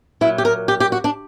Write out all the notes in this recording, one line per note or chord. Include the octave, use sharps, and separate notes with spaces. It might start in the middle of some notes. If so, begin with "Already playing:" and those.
A#2 F#3 E4
G4
A#4
G4
G4
F#4
D4